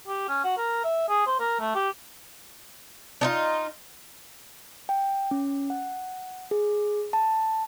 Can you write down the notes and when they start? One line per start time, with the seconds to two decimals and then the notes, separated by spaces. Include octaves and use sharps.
0.07 G4
0.29 C#4
0.44 F#4
0.58 A#4
0.84 E5
1.08 G#4
1.27 C5
1.40 A#4
1.60 A3
1.75 G4
3.21 D4 D#4 F4
4.89 G5
5.31 C#4
5.70 F#5
6.51 G#4
7.13 A5